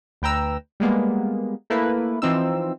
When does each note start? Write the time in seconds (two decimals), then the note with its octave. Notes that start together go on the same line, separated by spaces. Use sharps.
0.22 D2 B4 G5 A#5 E6
0.80 G3 G#3 A#3 B3
1.70 A3 A#3 E4 B4
2.22 E3 F3 C4 D#4 E6